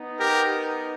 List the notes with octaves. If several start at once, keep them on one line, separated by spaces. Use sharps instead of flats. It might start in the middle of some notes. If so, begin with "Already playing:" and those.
Already playing: B3 D#4
G4 A#4